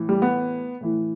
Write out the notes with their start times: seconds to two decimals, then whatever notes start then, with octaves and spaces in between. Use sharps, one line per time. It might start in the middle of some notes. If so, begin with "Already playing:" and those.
Already playing: A2 E3
0.09 G3
0.22 B3
0.81 A2 E3